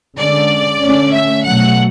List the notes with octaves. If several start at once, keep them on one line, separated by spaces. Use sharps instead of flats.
D3 G#3 C#4 D5
D3 A3 C#4
E5
B2 F#3 A3 F#5